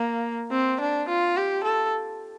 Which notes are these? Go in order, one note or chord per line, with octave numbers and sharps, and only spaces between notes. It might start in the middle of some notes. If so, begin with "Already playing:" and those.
Already playing: A#3
C4
D4
F4
G4
A4